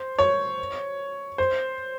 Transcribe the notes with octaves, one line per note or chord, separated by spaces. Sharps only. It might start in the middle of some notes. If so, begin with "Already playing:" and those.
Already playing: C5
C#5
C5